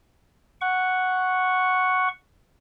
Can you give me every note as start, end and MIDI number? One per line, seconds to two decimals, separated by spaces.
0.61 2.08 78
0.61 2.08 85